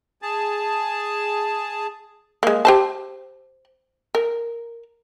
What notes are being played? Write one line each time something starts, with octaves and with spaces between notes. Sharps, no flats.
G#4 A5
G#3 A#3
G4 C5 A5
A#4